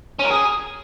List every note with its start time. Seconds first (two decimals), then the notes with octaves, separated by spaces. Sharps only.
0.19 C#4
0.25 A#4
0.31 G#4